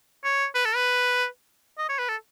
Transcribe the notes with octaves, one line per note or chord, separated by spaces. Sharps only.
C#5
B4
A4
B4
D#5
C#5
B4
A4